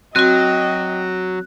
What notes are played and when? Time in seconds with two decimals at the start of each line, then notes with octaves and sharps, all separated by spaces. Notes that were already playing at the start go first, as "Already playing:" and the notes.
0.16 F#3 C4 F#4 D#5 G5 F#6